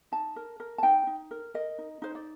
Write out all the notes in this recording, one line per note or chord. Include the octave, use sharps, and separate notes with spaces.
D#4 A5
A#4
A#4
A5
D#4 G5
D#4
A#4
A#4 D#5
D#4
D#4 C5
D5